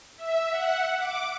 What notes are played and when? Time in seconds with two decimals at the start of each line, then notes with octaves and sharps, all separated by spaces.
0.16 E5
0.50 F#5
0.98 D6